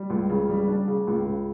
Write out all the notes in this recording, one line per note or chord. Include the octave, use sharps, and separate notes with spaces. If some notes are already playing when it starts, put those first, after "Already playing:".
Already playing: G3
C#2
C#3
G3
D4
C#3
C#2
C#3